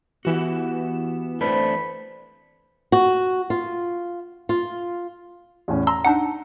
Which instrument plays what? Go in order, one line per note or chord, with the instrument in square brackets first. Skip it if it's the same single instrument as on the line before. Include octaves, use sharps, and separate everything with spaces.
[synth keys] E3 E7 [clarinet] B3 [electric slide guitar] F#4 G4 F#5
[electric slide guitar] A3 D4 B4 [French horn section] C4 C5 [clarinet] B5
[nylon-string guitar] F#4
F4
F4
[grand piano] E2 A2 C#4
[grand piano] A#5 [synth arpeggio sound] C6 E6
[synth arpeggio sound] D4 D#4 F#5